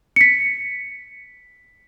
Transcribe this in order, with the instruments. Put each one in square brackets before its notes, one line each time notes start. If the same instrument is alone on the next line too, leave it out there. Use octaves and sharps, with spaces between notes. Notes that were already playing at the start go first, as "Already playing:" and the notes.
[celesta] B6 C#7